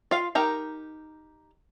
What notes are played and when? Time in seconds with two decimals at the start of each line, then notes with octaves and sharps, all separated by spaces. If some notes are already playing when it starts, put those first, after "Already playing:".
0.11 F4 F5
0.35 D#4 G4 A#4 A#5